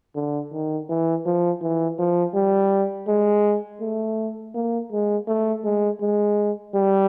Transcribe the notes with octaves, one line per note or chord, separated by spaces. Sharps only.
D3
D#3
E3
F3
E3
F3
G3
G#3
A3
A#3
G#3
A3
G#3
G#3
G3